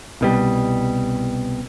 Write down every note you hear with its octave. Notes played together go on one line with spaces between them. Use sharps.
C2 B2 G3